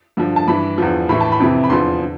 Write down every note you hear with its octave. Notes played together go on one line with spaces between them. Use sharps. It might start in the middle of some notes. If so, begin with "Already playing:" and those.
G2 D3 F3
A5
G2 E3 B5
E2 D3 F3
A2 E3 B5
A5
B5
F2 C3 E3
B5
E2 D3 F3 C6
D3